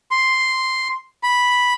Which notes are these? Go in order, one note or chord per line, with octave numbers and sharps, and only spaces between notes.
C6
B5